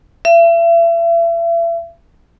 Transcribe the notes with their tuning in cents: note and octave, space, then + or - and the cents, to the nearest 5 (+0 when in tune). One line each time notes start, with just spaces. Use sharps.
E5 +40